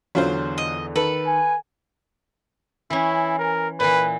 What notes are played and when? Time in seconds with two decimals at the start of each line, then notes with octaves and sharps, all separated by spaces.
0.15 E2 D3 F#3 F4 C5
0.58 D#5
0.96 D#3 A4 B4
1.27 G#5
2.90 E3 C#4 E4
3.39 A#4
3.80 A#2 E3 B4